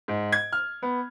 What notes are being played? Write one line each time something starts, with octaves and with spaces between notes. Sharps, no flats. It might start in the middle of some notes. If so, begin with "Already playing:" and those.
G#2
G#6
F6
B3